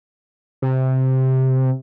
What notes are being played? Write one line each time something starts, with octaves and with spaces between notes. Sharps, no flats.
C3